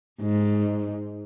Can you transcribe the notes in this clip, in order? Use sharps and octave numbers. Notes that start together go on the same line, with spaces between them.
G#2